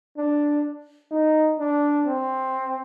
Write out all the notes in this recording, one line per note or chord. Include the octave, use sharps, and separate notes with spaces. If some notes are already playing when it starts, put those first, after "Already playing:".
D4
D#4
D4
C4